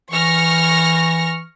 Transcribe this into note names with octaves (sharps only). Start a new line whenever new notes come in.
E3 C#6 F6 A#6